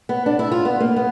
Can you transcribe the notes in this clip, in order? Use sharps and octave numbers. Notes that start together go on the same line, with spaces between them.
B3
D4
E4
F4
B3
A#3
B3